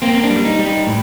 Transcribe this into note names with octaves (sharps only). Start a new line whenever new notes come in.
A#3 C4
C4
D4
G3
D#4
G3
D#4
A2